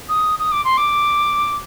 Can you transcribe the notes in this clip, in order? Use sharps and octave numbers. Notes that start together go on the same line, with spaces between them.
D#6
D#6
D6
C6
D6